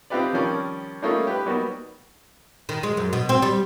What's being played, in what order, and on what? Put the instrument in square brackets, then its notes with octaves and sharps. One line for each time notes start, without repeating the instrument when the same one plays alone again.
[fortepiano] C4 D#4 F4 G4 B4 D5
D#3 F3 G3 C#4 A#4 D5
G3 A3 A#3 C#4 D#4 F4
G4 B4
F#3 G3 A#3 B3 D#4 F#4
[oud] D#3
G#3
F#2
B2
C4
G3